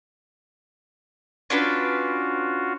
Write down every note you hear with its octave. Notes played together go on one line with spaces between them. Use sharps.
C#4 D4 F4 F#4 B4